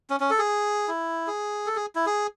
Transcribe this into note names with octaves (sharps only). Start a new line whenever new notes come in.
C#4
C#4
A4
G#4
E4
G#4
A4
G#4
E4
G#4